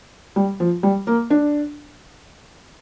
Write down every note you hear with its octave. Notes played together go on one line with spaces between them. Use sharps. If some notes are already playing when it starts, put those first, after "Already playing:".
G3
F3
G3
A#3
D4